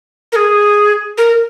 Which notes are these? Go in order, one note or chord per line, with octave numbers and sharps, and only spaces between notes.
A#4
G#4
A#4